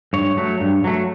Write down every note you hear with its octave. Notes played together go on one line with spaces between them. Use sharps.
G2 C#5
F#3 A3
G2
F#3 A3